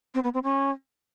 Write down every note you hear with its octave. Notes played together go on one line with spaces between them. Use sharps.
C4
B3
C4
C#4